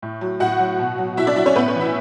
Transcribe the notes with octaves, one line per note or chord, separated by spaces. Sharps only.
A2
F#3
A2 F#4 F#5
F#3
B2
F#3
B2 E4 E5
D4 D5
F#3 E4 E5
C#4 C#5
A2 B3 B4
C#4 C#5
E3
E4 E5